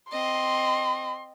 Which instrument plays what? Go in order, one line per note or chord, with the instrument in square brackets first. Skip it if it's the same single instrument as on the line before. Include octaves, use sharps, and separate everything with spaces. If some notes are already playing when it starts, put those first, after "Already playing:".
[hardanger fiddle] C4 D#5 [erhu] C6